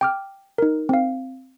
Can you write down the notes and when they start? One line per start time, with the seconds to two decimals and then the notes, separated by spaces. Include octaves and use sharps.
0.01 G5 D6 F6
0.58 D#4 A#4
0.89 C4 F5